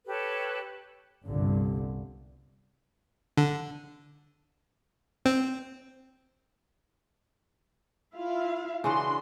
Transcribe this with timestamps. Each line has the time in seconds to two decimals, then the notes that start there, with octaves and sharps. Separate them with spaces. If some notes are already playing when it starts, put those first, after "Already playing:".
0.06 G4 A4 B4 C#5
1.25 G1 C2 G2 A#2 D3
3.37 D3
5.25 C4
8.15 E4 F4 F5
8.84 C#3 E3 D4 F#4 C6